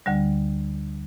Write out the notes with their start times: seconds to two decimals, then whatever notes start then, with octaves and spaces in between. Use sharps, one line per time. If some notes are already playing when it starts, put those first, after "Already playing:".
0.06 D2 D3 G3